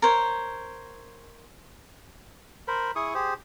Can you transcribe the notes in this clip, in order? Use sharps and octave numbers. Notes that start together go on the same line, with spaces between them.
A#4 C5 C#5
A#4 C5 B5
E4 G#4 C#6 D#6
G4 G#4 C5